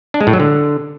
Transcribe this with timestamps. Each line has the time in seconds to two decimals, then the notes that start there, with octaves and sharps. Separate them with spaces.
0.14 D4
0.21 G#3
0.27 A2
0.33 F#3
0.40 D3